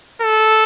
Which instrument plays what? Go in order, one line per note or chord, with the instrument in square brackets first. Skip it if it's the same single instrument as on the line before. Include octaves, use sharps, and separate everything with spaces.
[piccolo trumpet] A4